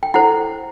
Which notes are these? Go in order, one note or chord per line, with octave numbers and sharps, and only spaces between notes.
G5
E4 A4 C5 F#5